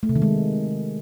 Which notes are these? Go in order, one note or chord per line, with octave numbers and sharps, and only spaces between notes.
A3
C3
D#3
G#3